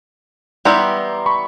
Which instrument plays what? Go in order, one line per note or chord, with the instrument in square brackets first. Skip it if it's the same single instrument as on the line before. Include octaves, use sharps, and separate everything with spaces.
[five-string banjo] E3 G3 B3 E4 G4 [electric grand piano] A#5 C6
[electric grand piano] B5 C#6